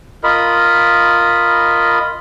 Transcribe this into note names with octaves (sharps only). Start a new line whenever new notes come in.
F4 A#4 D#5 B5